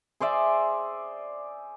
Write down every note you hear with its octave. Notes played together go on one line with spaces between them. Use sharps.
G#4 C5 D5 E5